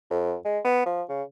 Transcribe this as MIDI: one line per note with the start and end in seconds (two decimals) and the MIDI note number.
0.10 0.36 41
0.45 0.59 56
0.65 0.84 59
0.86 1.02 53
1.09 1.23 49